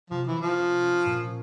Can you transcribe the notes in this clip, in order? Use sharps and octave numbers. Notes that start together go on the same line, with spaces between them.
C3 F3
E3
A#3
F3
C#4
C#4
A#2